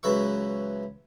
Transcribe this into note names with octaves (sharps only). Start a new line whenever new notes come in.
C#2 E3 F#3 B4 E5 C#6